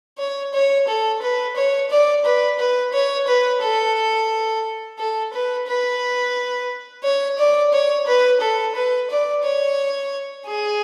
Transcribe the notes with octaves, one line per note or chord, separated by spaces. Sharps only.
C#5
C#5
A4
B4
C#5
D5
B4
B4
C#5
B4
A4
A4
B4
B4
C#5
D5
C#5
B4
A4
B4
D5
C#5
G#4